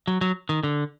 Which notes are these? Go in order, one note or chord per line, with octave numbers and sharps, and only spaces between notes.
F#3
F#3
D#3
D3